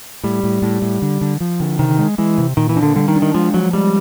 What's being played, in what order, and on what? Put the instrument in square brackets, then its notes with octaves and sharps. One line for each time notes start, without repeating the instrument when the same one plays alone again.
[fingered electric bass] A2 [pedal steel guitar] G3
[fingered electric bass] A2
A2
A2
D3
D3
F3
D3
[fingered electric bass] C3 [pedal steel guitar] D#3
[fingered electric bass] G#3
[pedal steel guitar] E3 [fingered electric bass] G#3
[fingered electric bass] C3
[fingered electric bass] A#2 [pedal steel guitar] D#3
[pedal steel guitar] E3
[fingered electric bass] D4
[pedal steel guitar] D3
[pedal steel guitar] D3 [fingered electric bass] G3
[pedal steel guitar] D#3
[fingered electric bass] D4
[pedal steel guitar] D#3
[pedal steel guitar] F3 [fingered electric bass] G#3
[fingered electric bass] F3 [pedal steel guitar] F#3
[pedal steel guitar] G3 [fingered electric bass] G#3